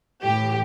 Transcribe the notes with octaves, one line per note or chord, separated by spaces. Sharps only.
A2 E3 G4